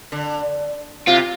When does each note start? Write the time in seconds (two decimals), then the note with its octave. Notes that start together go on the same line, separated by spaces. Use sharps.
0.12 D3
1.07 C3 F4